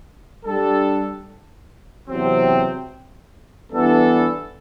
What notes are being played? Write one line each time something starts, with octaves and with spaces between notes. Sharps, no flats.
G3 D4 A4
E2 C3 F#3 C4
G2 E3 B3 D4 A4